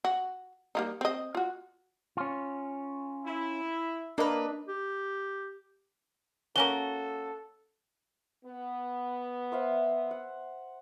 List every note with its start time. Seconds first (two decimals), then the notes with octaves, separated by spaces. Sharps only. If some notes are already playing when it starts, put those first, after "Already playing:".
0.05 F#4
0.75 G3 A#3 D#4
1.01 C4 D#5
1.35 F4 F#4
2.17 C#4 F4
3.24 E4
4.18 A#3 D4 B4 D#5
4.68 G4
6.56 A#3 C#4 F#4 A4 G7
8.45 B3
9.52 C5 E5 F5
10.11 F#5